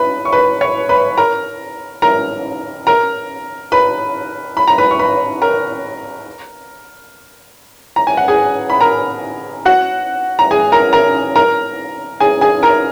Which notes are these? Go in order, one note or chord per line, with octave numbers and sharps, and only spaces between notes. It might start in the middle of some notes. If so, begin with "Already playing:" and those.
Already playing: B4 B5
C#6
B4 B5
C#5 C#6
B4 B5
A#4 A#5
A#4 A#5
A#4 A#5
B4 B5
B5
A#5
B4 B5
C#6
B4 B5
A#4 A#5
A#5
G#5
F#5
G#4 G#5
B5
A#4 A#5
F#4 F#5
A#5
G#4 G#5
A#4 A#5
A#4 A#5
A#4 A#5
G#4 G#5
G#4 G#5
A#4 A#5